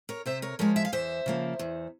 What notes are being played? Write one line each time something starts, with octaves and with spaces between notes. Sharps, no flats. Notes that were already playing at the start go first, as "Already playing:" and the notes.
A#4 C#5
C3 C5 E5
A#4 C#5
F3 G#3 A#4 C#5
E5
F5
E2 C5 E5
C#3 F3 A#3
E2